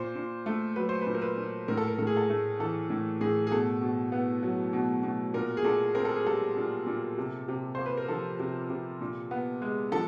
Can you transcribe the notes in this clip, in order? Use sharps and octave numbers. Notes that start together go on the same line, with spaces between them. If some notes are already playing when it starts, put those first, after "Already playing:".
Already playing: A#2 C5
A#2
A3
F#3 B4
C5
A#2 B4
A#4
B4
A#2
A2 A#4
A4
A#4
A2 A4
G#4
A4
A3
E3 A4
A2
A2 G#4
G#4
B2 A4
B2
B3
F#3
B2
B2
A#2 A#4
G#4
A#2 A4
C4 A#4
A4
G#4
G3 A4
A#2
A#2
C3
C3
A#3 C5
B4
A#4
F3 A4
C3
C3
A#2
B3
G#3
F3 A4